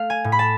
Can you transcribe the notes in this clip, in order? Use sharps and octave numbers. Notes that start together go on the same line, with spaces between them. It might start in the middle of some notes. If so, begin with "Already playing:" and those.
Already playing: A3 F5
G#5
A2
B5
A5